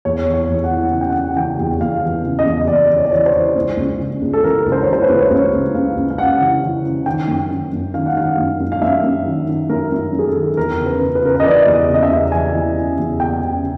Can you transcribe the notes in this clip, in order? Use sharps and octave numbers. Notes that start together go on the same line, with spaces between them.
E2 C#5
E3
C#5
E2
F#5
E3
C#3 F#5
G5
F#5
C#3
E3 G5
E2
E2 F5
E3
C#3
D#5
E2
E2 D5
E3
C#5
D5
E3 C#5
C5
E3
C#2
C#2
C#3
C#2
A4
E3 A#4
C#2
C5
E3 C#5
C5
B4
C#2
C#5
C#2 C5
C#2
C#2 F5
C#2
F5
C#3 F#5
E3
E3
C#3
D#3 G5
F#2
D#3
F#2
D#3 F5
F#5
D#3 F5
F#2
F#2
F5
F#2 E5
F#2
D#3
D#3
F#2 A#4
F#2
F#2
G#4
A4
D#3
E2 A#4
C#3
B4
C#3
B4
C#3 A#4
B4
D#5
E3 D5
E2
D#5
C#3
D#5
E5
E2
E2 G#5
E3
C#3
E2
E3 G5
C#3